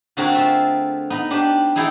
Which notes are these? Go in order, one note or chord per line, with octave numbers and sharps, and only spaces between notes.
D3 A3 C4 F#4 G#4 A#4
F4 E5
B3 D#4
B3 D4 G4 C5
D#4 E4 G#4 A4 F#5 G5